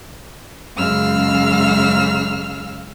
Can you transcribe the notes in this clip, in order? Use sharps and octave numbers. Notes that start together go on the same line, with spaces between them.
F#2 C#3 G#3 F5 E6 F6